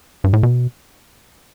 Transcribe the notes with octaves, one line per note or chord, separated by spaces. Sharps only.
G2
A2
B2